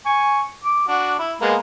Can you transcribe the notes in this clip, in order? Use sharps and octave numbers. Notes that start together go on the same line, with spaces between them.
G#5 C#6
D6
D4 F#4
E4
G#3 A#3 B3